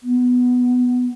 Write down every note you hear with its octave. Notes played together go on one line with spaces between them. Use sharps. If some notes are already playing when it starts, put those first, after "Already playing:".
B3